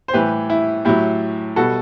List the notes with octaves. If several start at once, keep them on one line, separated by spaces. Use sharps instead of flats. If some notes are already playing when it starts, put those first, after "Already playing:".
C5
A2 E3 G3 G4 B4
E4
A2 F#3 E4 G4
B2 G3 F#4 A4